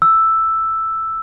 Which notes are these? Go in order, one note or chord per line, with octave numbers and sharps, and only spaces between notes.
E6